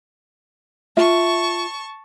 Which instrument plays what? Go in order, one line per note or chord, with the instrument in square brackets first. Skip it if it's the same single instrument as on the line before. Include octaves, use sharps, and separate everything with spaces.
[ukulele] F4 E5 [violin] A5 C#6